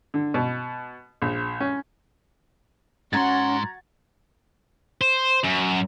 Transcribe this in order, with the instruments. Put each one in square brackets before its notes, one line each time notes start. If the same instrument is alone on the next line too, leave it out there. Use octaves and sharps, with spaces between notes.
[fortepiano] D3
B2
A#1
C#4
[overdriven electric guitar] G#2 C6 [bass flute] C#4 [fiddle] F#4 F#5 [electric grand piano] A#5 G#6 A6
[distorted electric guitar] C5
F#2